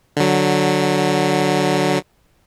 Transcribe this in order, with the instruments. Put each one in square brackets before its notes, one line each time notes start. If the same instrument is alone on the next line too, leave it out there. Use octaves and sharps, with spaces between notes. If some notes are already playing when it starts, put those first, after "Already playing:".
[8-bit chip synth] D3 F#3